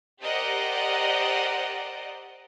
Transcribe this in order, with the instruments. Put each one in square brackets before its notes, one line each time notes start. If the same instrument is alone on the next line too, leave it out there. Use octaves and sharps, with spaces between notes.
[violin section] G4 A#4 C5 D5 D#5 F#5